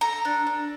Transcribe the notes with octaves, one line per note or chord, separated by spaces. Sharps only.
A4 A#5
D4
D4